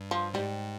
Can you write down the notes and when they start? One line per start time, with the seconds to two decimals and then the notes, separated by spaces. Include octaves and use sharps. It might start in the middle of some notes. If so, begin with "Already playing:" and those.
Already playing: G2
0.11 F3
0.34 G#2 G3